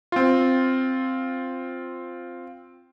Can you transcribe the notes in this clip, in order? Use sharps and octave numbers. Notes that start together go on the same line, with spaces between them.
C4 F4